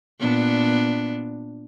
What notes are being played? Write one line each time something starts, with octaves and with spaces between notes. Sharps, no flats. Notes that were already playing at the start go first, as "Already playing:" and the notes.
A#2 B3 D4